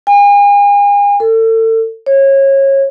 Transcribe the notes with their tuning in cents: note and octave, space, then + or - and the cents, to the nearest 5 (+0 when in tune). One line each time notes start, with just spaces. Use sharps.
G#5 -40
A4 +35
C#5 -25